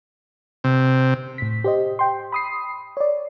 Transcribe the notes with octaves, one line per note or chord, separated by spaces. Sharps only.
C3
A2 B6
G4 C5 D#5
G5 C6
B5 D#6 C7
C#5 D5